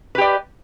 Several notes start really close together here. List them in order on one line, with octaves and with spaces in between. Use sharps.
B4 G4 D5